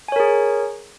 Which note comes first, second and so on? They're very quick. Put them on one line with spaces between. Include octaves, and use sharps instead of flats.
G#5 C#5 A#4 G#4